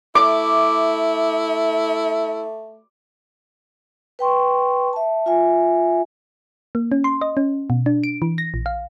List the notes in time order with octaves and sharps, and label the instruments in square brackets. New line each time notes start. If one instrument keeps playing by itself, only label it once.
[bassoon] A3 [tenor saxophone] E4 [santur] D6
[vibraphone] B4 G5 C6 C#6
E5 A5
F4 E5 G#5
[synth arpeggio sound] A#3
C#4
C6
D#5
C#4
B2
D4
D7
E3
A#6
A#1
F5